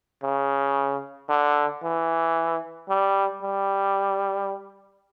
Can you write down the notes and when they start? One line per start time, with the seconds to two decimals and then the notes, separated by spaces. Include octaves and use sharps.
0.23 C#3
1.29 D3
1.83 E3
2.89 G3
3.43 G3